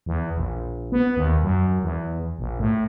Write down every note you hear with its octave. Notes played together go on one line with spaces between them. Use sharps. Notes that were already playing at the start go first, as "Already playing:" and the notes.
E2
A#1
B3
D#2
F#2
E2
A#1
A2